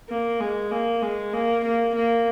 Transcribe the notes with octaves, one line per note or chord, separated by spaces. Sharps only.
A#3
G#3
A#3
G#3
A#3
A#3
A#3